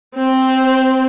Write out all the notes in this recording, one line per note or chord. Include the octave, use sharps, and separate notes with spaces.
C4 C5